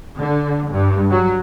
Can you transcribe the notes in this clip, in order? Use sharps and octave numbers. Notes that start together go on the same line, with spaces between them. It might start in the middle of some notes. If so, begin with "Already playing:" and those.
D3
G2
F#3